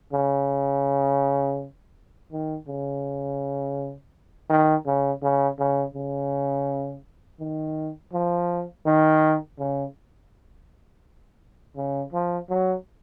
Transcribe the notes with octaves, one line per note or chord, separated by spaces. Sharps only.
C#3
D#3
C#3
D#3
C#3
C#3
C#3
C#3
D#3
F3
D#3
C#3
C#3
F3
F#3